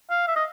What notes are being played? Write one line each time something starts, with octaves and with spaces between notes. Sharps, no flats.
F5
E5
D#5